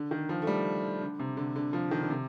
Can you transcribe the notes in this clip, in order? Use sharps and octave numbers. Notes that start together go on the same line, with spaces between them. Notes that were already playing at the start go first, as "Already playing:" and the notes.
Already playing: D3
D#3
F3
A3
G3
D3
C3
D3
D3
F3
D#3
D3
C3